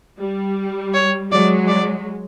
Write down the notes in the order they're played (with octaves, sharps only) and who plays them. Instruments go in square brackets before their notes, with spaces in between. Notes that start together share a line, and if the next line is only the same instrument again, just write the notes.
[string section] G3
[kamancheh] C#5
[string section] F#3 G#3 [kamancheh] D5
[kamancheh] D5